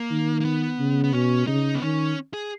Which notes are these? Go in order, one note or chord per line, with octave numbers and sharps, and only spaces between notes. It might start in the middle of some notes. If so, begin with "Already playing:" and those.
Already playing: A#3
D#3
A#3
B3
C#3
B3
B2 C#4
C#3 D#4
B3
D#3 C#4
G#4